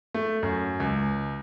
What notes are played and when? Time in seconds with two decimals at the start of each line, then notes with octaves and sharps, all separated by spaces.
0.14 A3
0.43 F#2
0.80 C#2